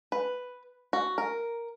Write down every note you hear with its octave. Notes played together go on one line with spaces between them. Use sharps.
B4
F#4
A#4